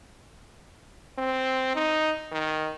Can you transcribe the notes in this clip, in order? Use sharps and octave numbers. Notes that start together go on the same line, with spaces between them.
C4
D#4
D#3